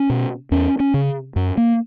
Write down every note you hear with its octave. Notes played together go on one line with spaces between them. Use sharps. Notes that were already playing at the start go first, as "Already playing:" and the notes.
Already playing: C#4
B2
E2 C#4
C#4
C#3
F#2
A#3